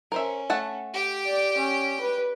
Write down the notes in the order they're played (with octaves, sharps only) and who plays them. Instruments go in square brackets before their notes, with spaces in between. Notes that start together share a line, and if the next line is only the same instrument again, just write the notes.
[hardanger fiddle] C#4 [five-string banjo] A#4 C5 E5
[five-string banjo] A3 F#5 A5
[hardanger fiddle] G4 G5
[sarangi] D5
C#4
B4